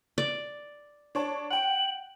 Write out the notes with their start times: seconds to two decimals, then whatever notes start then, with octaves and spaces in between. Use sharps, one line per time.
0.18 D5
1.15 D4 C#5 A5
1.50 F#5 G5 F#7